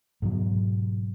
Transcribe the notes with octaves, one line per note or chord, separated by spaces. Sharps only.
G#2 B2 F#3